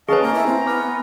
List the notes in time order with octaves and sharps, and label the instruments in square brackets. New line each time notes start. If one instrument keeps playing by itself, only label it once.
[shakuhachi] C#4 [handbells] G#4 B4 [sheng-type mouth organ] D#5 F5 A5 [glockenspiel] G#5 C#6
[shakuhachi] A#3 [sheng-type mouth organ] A#5
[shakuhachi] E4
C4
[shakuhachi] B3 [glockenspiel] D6 F6